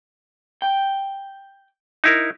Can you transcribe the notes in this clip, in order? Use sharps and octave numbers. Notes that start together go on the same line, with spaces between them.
G5
D#4 E4 A#4